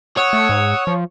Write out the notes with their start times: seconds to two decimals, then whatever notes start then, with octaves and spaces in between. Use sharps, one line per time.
0.17 C#5 F#5 D#6 E6
0.33 A3
0.49 G#2
0.87 F3